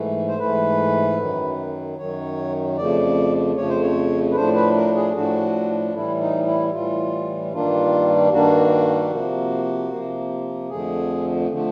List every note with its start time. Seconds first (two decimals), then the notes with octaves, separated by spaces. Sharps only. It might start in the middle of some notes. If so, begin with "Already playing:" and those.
Already playing: G#2 E3 A3
0.28 C5
0.39 G#2 E3 A3 B4
1.19 F#2 D#3 F#3
1.98 F#2 D#3 F#3 C#5
2.77 F2 C#3 F3 A3 D5
3.56 F2 C#3 F3 A3 C#5
3.69 C5
3.82 C#5
4.31 B4
4.35 A2 F3 A3 D4 C5
4.56 B4
4.76 A#4
4.95 G#4
5.15 A2 F3 A3 D4 F#4
5.94 A2 E3 G3 E4
6.21 D#4
6.47 E4
6.73 A2 E3 G3 F4
7.53 G2 D#3 G3 A#3 D4 F4
8.32 G2 D#3 G3 A#3 D4 F#4
9.11 C3 F3 A#3
9.91 C3 F3 A#3
10.70 F2 D3 F3 A3 G#4
11.51 D3 F3 A3